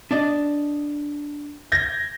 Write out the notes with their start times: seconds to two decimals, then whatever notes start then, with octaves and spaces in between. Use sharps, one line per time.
0.11 D4 D5 D#5
1.72 G6 G#6 A#6